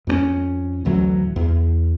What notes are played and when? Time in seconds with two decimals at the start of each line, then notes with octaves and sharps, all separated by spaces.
0.07 F2 A#3 C#4
0.85 A1 D2 E3 F#3
1.36 E2